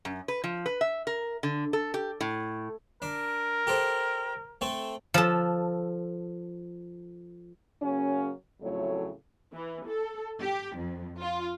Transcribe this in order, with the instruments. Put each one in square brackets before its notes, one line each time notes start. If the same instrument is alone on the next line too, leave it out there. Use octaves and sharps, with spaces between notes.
[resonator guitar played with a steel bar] F#2
B4
F3
B4
E5
A#4
D3
A4
G4
A2
[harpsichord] D4 [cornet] A#4
[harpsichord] G4 A4 C5
A3 C4 A4
[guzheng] F3 A4
[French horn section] C#3 F#3 A#3 C#4
F2 A2 C#3 F#3 A3 C#5
[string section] E3
A4
G4
F2
F4